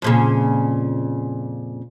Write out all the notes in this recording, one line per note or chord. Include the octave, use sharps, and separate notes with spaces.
F2 A#2 C#3